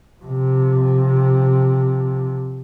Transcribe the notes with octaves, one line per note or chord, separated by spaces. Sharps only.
C3 F3